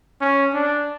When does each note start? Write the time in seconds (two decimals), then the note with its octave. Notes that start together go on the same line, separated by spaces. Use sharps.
0.21 C#4
0.53 D4